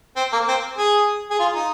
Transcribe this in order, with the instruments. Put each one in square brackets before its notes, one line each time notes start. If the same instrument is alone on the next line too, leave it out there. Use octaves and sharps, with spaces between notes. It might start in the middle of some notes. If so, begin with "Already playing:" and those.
[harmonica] C4
A#3
C4
G#4
G#4
F4
D#4